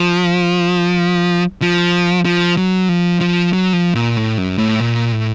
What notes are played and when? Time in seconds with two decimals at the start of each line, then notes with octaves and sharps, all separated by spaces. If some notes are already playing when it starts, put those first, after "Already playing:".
Already playing: F3
1.62 F3
2.25 F3
2.57 F#3
2.89 F3
3.21 F3
3.53 F#3
3.73 F3
3.95 A#2
4.16 A2
4.38 F#2
4.58 A2
4.80 A#2
5.12 A2